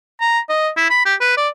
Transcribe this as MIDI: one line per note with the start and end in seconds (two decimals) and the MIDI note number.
0.21 0.39 82
0.49 0.69 75
0.77 0.87 64
0.90 1.04 83
1.05 1.15 67
1.20 1.34 71
1.37 1.49 74